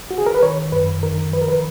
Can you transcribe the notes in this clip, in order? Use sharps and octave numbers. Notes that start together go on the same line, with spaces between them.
F#4
G#4
A#4
B4
D#3 C#5
F#2 B4
D#3 A#4
F3 B4
A#4
B4